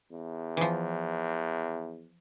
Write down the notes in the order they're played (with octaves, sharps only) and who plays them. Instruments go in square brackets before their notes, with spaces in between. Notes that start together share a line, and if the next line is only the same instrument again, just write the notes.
[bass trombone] E2
[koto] E3 F3